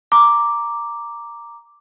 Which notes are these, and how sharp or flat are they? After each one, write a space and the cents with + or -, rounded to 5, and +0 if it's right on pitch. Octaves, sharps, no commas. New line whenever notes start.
A#5 +0 D6 +0